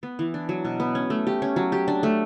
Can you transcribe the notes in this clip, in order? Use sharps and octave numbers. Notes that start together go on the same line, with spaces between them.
B3
E3
D4
F#3
B2
B3
C#4
A3
G4
C#4
F#3
G4
D4
A3